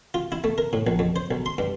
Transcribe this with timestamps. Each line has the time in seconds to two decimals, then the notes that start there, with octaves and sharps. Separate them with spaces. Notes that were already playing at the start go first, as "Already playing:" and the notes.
0.14 F4
0.32 E4
0.44 A3
0.58 A#4
0.73 A2
0.87 A#1
0.99 F2
1.16 C5
1.31 B1
1.46 C6
1.58 G2